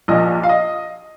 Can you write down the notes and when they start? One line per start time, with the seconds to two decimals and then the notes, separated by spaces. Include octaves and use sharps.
0.08 A#1 A#2 F3 D#5
0.43 F5
0.49 D#5